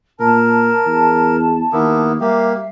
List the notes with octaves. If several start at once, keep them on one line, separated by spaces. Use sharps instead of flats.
A#2 A#4 A5
E2
D#2 A#3 B3 E4
G3 A#3 G4 E5 F5